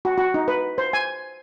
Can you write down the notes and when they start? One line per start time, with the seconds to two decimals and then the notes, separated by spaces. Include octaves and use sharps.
0.05 F#4
0.18 F#4
0.34 D#4
0.48 B4
0.78 C5
0.93 G#5